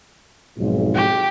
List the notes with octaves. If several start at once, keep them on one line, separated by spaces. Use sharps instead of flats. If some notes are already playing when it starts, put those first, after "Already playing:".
B1 F2 G#2
G4